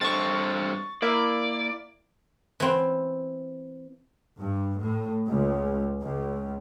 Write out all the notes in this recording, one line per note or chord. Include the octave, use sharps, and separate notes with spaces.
G2 C4 A4 C#6 A6
A#3 E4 D5
E3 C4
G2
A2
C#2
C#2